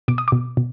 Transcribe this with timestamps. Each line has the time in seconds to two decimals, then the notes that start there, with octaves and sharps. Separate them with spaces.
0.08 B2 D6
0.18 D#6
0.28 B2 D6
0.57 B2